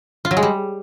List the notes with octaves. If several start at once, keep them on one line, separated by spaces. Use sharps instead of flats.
F4
F#3
G#3
G3